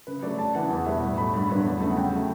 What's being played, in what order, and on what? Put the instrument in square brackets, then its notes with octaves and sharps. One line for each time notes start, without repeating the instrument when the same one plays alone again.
[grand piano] C#3 B4
F#3 A3 D5
F#2 A5
C#3 E3 F#5
E2
B2 G3 B3 E5
A2
F#3 A3 B5
G2
D3 F#3 B3
E2
C#3 F#3 A3
F#5
C#3 G5
F#3 A3